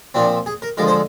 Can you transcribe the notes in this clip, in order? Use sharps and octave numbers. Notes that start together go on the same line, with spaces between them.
A#2 F3 C4 D4
G#4
A#4
D3 F3 G#3 A#4
C5